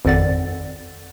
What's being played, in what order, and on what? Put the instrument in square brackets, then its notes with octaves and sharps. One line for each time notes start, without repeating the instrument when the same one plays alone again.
[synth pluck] G#1 F2 A4 D5 F#5 A6